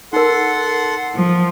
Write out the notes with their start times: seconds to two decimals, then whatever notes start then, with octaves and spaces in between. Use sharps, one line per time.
0.13 D#4 A4 A#4 F#5 C6
1.16 F3